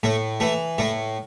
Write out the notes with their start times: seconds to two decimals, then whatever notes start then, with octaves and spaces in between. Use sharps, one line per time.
0.03 A2 A3
0.40 E3 A3
0.78 A2 A3